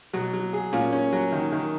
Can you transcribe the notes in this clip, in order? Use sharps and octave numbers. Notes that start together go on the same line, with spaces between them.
B2 F#3
F#3
G#4
A#2 C#4
C#4
F#3
D#3
D#3